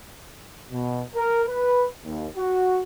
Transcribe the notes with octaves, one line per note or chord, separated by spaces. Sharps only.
B2
A#4
B4
D#2
F#4